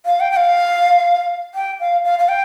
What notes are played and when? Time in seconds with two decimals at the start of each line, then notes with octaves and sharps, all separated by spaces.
0.06 F5
0.20 G5
0.32 G5
0.36 F5
1.54 G5
1.80 F5
2.05 F5
2.19 F5
2.29 G5